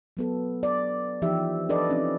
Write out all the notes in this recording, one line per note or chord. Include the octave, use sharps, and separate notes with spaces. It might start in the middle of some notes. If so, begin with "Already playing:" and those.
F#3 B3 A4
D5
E3 F3 D#4 G4 E5
D4 A4 B4 D5 D#5
C4 C#4 D#4